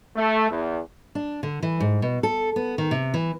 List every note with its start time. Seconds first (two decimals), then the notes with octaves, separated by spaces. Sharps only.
0.16 A3
0.50 E2
1.15 D4
1.43 D3
1.62 E3
1.80 G#2
2.02 B2
2.23 A4
2.56 B3
2.78 D#3
2.91 C3
3.14 E3